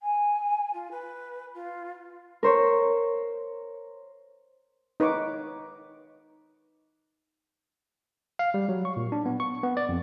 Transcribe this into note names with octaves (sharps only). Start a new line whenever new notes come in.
G#5
F4
B4
F4
A#4 C5 C#5
D#4 B4 C#5 C#6 D6
F5
G3
F#3
C#6
A#2
D4
B3
C#6
B3
D5
F2